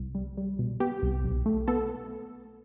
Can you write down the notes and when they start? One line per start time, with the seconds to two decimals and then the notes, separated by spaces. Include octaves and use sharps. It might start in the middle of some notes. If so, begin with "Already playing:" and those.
Already playing: C2
0.15 G3
0.37 G3
0.59 B2
0.80 B3 G4
1.03 C2
1.24 B1
1.46 A3
1.68 B3 A4